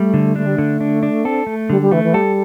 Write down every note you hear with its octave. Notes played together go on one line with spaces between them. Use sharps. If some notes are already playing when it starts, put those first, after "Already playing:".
Already playing: G3 A3
D3
A3 D4
G3
D3 A3
D4
D4
C4 A4
A3
D3 G3
G3
E3 A3
E3
G3 A4